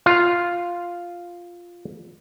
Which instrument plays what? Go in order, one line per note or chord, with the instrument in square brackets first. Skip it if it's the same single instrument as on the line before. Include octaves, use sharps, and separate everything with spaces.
[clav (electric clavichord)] F4 F5